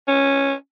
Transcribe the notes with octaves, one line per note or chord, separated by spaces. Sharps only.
C#4